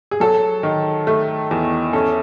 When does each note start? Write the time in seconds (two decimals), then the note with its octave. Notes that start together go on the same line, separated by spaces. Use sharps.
0.11 G#4
0.20 F#3 A4
0.63 D#3
1.07 A3
1.51 E2
1.93 C#4 A4